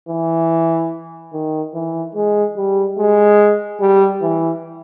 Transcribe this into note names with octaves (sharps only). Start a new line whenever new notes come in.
E3
D#3
E3
G#3
G3
G#3
G3
E3